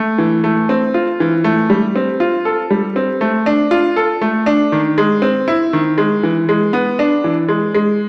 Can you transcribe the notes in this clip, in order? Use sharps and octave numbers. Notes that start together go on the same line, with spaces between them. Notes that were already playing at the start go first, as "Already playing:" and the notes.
Already playing: A3
E3
A3
C4
F4
E3
A3
G3
C4
F4
A4
G3
C4
A3
D4
F4
A4
A3
D4
D#3
G#3
C4
E4
D#3
G#3
E3
G#3
B3
D4
E3
G#3
G#3